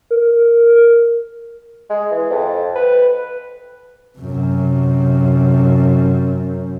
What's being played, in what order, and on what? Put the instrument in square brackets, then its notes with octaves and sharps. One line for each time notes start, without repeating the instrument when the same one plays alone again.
[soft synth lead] A#4
[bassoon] G#3
E3
F2
B4
[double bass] F#2 C3